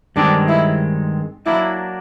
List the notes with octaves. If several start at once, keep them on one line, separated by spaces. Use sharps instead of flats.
G2 D#3 G#3 C4 D4
E4
F#3 A#3 D4 E4